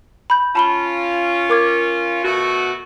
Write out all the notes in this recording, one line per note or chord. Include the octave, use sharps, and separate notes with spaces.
B5 G6
C#4 F4 A5 B5 G7
A#4 D6 G#6
B2 A3 F#4